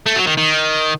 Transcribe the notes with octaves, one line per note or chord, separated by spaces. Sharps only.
A3
F#3
D#3
D#3